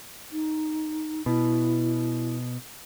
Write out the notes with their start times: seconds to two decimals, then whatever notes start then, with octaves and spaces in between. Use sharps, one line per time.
0.32 D#4
1.26 B2 E4